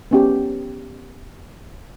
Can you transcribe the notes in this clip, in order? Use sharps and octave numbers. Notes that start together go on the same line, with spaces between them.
B3 C#4 G4